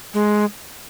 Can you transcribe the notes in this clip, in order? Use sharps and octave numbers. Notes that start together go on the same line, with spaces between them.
G#3